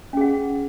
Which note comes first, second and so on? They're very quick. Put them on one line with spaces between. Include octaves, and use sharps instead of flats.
C#4 G#4 F#5